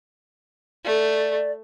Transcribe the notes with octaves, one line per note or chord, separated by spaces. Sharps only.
A3 D5